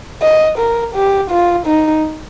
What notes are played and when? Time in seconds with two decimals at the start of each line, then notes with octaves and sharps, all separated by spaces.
0.22 D#5
0.59 A#4
0.95 G4
1.31 F4
1.67 D#4